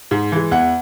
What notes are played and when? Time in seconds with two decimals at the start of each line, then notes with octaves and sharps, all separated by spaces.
0.11 G#2
0.32 E3 G#3
0.51 E2 F#5